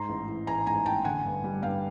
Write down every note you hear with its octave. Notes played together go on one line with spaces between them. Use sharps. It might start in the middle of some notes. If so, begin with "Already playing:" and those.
Already playing: G#2 A#5 C6
A1
E3
A1 G#5 A#5
G#2 G#5 A#5
A1 G5 A5
D3 F#5 G#5
G2
G3
G2 F5 G5